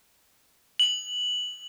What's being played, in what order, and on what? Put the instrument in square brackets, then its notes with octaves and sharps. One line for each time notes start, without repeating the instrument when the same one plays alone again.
[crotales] F#7